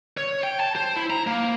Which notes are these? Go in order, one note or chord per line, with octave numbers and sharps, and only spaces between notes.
C#5
G5
A5
C5
E4
A#5
A#3